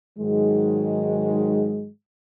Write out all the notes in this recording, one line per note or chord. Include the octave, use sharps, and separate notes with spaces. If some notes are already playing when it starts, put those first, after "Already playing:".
G#2 D#3 F#3 G#3